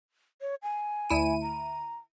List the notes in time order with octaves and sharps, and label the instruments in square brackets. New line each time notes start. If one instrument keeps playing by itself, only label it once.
[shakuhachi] C#5
G#5
[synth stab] D2 E4 D#7
[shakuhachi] A#5